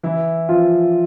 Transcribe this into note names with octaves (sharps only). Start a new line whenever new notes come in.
E3 E4
F3 F4